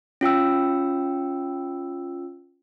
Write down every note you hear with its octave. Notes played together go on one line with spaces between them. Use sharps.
C#4 F4 G5 E6